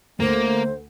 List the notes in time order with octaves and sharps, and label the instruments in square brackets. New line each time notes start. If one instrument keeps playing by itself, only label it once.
[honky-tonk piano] D2 [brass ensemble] A3 [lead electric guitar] A#3 [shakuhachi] C5